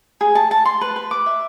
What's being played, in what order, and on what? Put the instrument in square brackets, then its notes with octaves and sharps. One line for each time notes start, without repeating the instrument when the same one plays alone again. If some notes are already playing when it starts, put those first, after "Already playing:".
[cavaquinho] G#4
A5
A5
C6
B4
B4
D6
E5